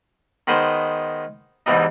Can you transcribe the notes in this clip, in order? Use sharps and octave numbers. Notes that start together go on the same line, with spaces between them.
D#3 G#3 B3 B4 C5
E2 G#2 E3 G3 D#4